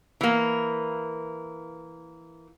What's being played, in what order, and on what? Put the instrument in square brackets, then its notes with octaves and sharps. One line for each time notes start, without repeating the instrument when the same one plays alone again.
[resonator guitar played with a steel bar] E3 A#3